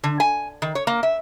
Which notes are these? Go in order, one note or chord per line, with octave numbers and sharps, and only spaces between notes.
D3
G#5
D#3
C#5
A#3
E5